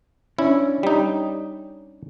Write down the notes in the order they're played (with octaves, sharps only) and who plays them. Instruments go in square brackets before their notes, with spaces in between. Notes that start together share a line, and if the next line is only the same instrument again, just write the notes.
[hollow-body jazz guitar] C#4 D4 [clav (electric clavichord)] E4
[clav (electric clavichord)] G3 D#4